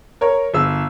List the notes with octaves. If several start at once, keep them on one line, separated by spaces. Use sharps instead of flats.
A#4 C#5
G1 E6